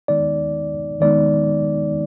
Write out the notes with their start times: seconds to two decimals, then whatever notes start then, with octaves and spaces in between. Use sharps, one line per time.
0.08 D#3 G#3 B3 D#4 D5
1.01 D#3 G#3 B3 D#4 D5